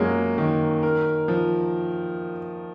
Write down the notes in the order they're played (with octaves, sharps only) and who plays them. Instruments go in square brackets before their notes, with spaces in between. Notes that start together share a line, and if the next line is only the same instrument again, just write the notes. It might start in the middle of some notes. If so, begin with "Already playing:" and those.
Already playing: [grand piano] F#2 A#3 C#4 [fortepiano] F#3 G#3
[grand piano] D#3
A#4
F3